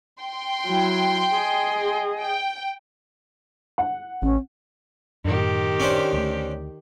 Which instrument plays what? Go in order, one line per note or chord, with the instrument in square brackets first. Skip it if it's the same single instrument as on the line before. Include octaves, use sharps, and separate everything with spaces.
[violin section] G5 C6
[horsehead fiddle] F#3 E4
G#4 D#5
[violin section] G5
[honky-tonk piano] F#5
[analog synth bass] A1 [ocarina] C#4
[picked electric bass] F#2 A2 [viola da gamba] D#3 G4
[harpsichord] C#4 D4 C5
[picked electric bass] D2 A3